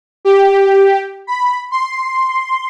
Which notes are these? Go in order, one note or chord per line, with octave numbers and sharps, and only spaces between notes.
G4
B5
C6